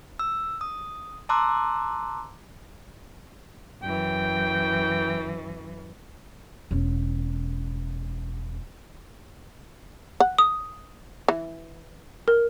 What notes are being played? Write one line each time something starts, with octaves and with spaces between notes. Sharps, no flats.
E6
D#6
A5 A#5 C6 D6 E6 F#6
F#2 E3 G5
E1 C#4
F#5
D#6
E3
A#4